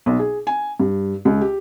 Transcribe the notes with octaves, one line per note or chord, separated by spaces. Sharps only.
B1
G#4
G#5
G2
C#2
G4